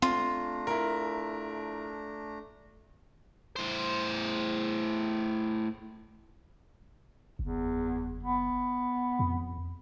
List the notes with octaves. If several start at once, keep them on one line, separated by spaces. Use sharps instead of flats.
A3 C4 D4 F4 A#5
E4 A#4
A2 C5
F#1 E2
B3
F2